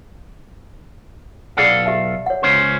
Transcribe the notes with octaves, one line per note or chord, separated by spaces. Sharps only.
B1 G#4 A4 D5 F5 F#5
G4 E5 A5
C#5 F#5
C#2 C#4 C5